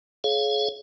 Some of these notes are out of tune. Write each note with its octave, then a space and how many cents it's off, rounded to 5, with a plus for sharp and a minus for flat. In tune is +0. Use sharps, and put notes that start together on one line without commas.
G#4 +35 C#5 +0 F5 +0